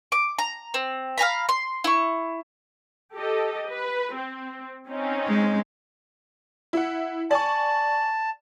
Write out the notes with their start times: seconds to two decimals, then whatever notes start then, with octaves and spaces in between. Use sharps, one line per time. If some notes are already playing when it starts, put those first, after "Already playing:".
0.12 D6
0.38 A#5
0.74 C4
1.18 F5 G#5 A#5 B5
1.49 C6
1.84 E4 C#6
3.15 G4 A4 D#5
3.68 B4
4.15 C4
4.87 C4 C#4 D#4
5.29 G#3
6.73 E4 F#5
7.31 D5 G#5 A5 C#6